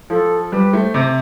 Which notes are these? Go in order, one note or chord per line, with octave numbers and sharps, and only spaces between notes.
F3 A4
G3 B4
A3
C5
C3